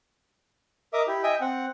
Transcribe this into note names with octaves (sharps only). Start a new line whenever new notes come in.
A#4 D#5 E5 D6 D#6
E4 G4
D#5 E5 G5 G#5
C4 F#5